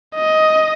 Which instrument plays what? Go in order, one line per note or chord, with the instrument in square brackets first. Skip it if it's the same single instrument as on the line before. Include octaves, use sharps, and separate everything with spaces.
[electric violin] D#5